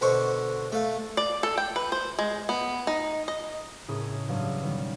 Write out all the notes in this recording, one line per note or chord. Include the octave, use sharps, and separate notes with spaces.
B2 D3 C5 C6 C#6
A3 F5
D5
A4
G5
B4
C5
G#3
B3
D#4
D#5
A2 C#3 C#4 G#4 A#4 D#6
A1 G2 F#3 D#5 F5
B2 D#3 G3